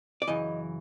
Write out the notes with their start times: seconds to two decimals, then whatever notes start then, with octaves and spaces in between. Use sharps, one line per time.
0.22 D5
0.27 F#2 C#3 E3 D#5